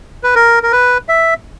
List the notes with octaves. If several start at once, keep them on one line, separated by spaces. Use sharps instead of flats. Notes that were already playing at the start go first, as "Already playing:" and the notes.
B4
A#4
A#4
B4
E5